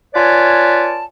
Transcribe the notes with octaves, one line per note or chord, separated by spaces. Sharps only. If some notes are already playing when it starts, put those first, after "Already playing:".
F4 B4 C#5 D5 G#5 A5